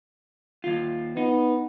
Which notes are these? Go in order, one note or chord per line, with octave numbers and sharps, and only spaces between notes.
D#2 F4
B3 D#4